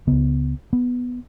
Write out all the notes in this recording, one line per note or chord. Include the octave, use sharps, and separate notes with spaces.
C#2 C#3 B3
B3